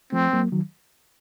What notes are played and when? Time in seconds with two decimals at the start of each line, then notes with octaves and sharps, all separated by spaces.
0.12 F3 A3 C4
0.33 F#3 A#3
0.52 D#3 F#3